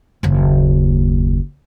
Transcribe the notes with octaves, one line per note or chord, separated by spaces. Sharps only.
F#1 D#2